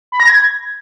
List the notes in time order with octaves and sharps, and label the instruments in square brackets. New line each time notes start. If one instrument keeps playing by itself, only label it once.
[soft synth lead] B5
A#6
G#6